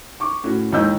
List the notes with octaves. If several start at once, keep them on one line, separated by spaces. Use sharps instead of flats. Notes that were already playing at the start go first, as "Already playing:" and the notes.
C#6 D6
A2 C#4 F#4
D#2 G#2 E3 D#5 E6 G6